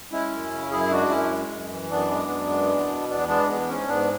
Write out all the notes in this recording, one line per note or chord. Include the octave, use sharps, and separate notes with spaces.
G#3 C#4 E4
F#2
C#3
F#2 E4 G#4
G#3 D4 F#4
F#2 C#4 E4
G#3
F#2
E3
F#2 B3 D4
G#3
F#2
G#3
E2
B2
E2 B3 D4
G#3 B3 D4
E2 B3
G#2 C#4
G#2 B3 D4